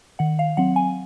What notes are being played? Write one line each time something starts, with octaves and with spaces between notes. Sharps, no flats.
D#3 F#5
F5
F#3 C4 F#5
G#5